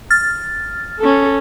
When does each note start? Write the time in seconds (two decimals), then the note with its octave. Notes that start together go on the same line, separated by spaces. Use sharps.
0.10 F6 A6
0.99 C#4 A4